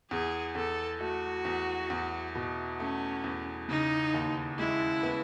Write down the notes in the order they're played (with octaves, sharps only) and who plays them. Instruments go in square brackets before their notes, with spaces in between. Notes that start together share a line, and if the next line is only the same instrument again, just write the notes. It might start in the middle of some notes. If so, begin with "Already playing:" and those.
[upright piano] E2 [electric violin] G#4
[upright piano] E2 [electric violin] A4
[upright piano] A3 [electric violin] F#4
[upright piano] E2
E2
B2
[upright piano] A3 [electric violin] C#4
[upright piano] E2
[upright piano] C#3 [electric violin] D#4
[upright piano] D#2
[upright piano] G#3 [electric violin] E4
[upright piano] B3